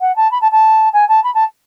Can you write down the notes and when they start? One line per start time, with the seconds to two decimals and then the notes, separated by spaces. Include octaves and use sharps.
0.01 F#5
0.16 A5
0.31 B5
0.42 A5
0.52 A5
0.93 G#5
1.09 A5
1.24 B5
1.35 A5